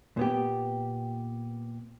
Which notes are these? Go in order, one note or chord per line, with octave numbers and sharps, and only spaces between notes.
A#2 B3 G4